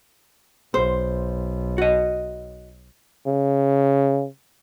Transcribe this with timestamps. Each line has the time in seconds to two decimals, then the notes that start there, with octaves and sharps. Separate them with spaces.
0.74 B1 C5
1.78 F#4 D#5
3.26 C#3